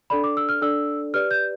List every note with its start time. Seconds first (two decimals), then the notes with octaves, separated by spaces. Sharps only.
0.10 D4 A4 D5 B5
0.24 D6
0.37 E6
0.49 F6
0.62 D4 A4 D5 E6
1.14 G4 B4 D5 F6
1.31 G6